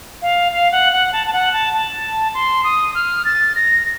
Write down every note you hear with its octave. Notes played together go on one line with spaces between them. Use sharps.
F5
F5
F#5
F#5
A5
A5
F#5
A5
A5
C6
D#6
F6
A6
A#6